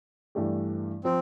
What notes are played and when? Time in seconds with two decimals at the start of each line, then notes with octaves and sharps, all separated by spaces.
0.35 G2 E3 A3 D4 G4
1.04 F3 C4